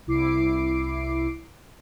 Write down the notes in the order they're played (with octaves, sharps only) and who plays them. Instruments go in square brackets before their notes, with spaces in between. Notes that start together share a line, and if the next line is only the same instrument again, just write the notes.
[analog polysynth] C2 E4 D6 C7 D7